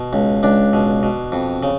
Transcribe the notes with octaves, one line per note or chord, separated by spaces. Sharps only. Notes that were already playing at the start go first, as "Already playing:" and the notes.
Already playing: B2
C#2
C#2 D4
B2
B2
F2
C#3